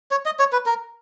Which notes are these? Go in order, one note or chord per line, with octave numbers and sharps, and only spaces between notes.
C#5
D#5
C#5
B4
A#4